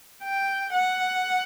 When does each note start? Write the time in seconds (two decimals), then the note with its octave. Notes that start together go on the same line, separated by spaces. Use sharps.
0.23 G5
0.73 F#5